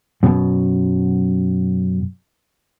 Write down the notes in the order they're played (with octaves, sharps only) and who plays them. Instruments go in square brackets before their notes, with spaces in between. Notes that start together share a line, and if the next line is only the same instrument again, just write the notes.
[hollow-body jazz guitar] F#2 B2